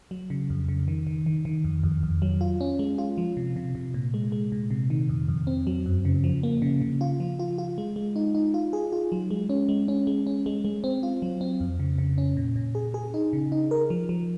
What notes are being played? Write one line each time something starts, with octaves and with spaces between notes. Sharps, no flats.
F#3
C#3
F2
C#3
D#3
D#3
D#3
D#3
F2
F2
F2
F#3
F4
C#4
G#3
F4
F3
C3
C3
C3
A#2
G#3
G#3
A#2
C3
D#3
F2
F2
C4
F#3
F#2
C#3
F3
A#3
C#3
C#3
F4
F3
F4
F4
G#3
G#3
D#4
D#4
F4
G#4
F4
F#3
G#3
C#4
G#3
C#4
G#3
C#4
G#3
G#3
C4
F4
F#3
C4
F2
C#3
C#3
C#4
A#2
A#2
G#4
G#4
D#4
C#3
D#4
A#4
F3
F3